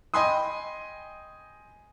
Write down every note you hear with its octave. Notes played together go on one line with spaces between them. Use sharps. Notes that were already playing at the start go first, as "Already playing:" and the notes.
D#5 G5 G#5 B5 C6 D#6